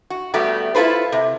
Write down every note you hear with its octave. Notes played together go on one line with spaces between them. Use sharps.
F#4
G3 A3 B3 F#4 G4
E4 F4 A4 B4 C5
C3